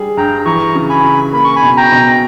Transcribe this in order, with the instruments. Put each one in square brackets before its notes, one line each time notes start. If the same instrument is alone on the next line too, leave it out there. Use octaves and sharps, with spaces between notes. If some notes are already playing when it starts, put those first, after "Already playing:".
Already playing: [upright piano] G3 G#4
[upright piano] G2 [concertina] G5 A#5
[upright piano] E3 [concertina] A#5 C#6
[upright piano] C#3
[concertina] G#5 B5
[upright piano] C#3
[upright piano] A#3 [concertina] B5
[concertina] C#6
G#5 B5
[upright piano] B2
[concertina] G5 A#5
[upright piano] B2